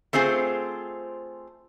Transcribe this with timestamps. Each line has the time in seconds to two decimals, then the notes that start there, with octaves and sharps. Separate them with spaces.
0.13 A3 C4 F4 G#4 C5